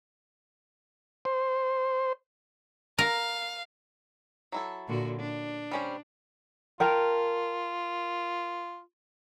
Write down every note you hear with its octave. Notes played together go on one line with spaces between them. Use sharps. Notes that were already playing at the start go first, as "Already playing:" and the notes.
C5
A#4 F5
F#3 E4 A4
A#2 D3 F#4
D4
G3 C#4 C5
F4 A#4 G5 A5